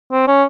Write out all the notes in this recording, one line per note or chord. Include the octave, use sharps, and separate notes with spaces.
C4
C#4